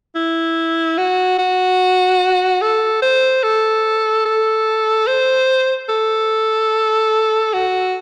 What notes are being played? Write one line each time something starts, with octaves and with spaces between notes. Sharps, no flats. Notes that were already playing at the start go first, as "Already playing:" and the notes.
E4
F#4
F#4
A4
C5
A4
A4
C5
A4
F#4